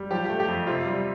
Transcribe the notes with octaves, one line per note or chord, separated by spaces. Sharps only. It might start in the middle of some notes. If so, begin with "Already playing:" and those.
Already playing: G3
F3 G4
A3 G4
G4
F2
C3 F4
G3